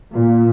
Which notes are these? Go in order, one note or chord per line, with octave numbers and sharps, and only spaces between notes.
A#2